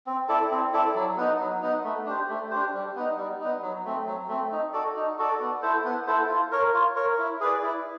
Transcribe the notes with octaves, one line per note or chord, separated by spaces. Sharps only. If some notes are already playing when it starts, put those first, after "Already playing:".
C4
E4 A4 D5
C4
E4 A4 D5
F#3
B3 D#4
F#3
B3 D#4
A3
D4 G4 C5
A3
D4 G4 C5
G3
B3 D#4
G3
B3 D#4
F#3
A3 C4
F#3
A3 C4
D#4
F#4 A4 D5
D#4
F#4 A4 D5
B3
E4 A4 C5
B3
E4 A4 C5
F4
A#4 C#5
F4
A#4 C#5
E4
G#4 B4 D5
E4